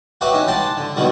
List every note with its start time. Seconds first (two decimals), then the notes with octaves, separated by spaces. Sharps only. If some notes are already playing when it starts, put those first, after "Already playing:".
0.21 F#3 F#4 G4 B4 E5
0.34 C#4 D#4
0.48 G4 F#5 G5 A5 C6
0.77 D3
0.96 B2 D3 D#3 F#3 G3